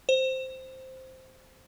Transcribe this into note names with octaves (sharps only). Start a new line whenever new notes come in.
C5